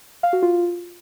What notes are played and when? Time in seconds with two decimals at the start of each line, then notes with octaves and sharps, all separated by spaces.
0.23 F5
0.33 F#4
0.42 F4